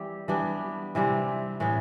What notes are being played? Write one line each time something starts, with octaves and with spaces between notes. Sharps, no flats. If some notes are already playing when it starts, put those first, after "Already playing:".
Already playing: E3 G3 C4 G4
E3 G3 B3 D4
C3 E3 G3 C4
A2 E3 B3